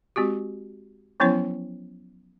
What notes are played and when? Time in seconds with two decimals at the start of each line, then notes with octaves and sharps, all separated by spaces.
0.16 G#3 C4 F#4 G4
1.20 F3 F#3 B3 C#4 E4 C#5